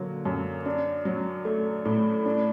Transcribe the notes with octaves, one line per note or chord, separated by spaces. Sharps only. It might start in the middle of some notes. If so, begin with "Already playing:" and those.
Already playing: D3 F#3 A#3
F#2
D4
F#3
A3
A2
D4